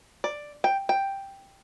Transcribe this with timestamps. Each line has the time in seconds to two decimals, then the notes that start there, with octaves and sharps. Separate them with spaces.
0.24 D5
0.64 G5
0.89 G5